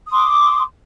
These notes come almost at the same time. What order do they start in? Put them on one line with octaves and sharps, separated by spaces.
D#6 C6 D6